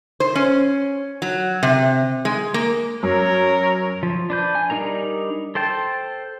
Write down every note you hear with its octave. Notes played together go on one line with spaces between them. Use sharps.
C5
C#4
F#3
C3
G#3
A#3
F#2 A#4 C#5
F3
D4 B4 G6
G#5
G3 D4 D#4 A#4 A#5
A4 C5 G5 A5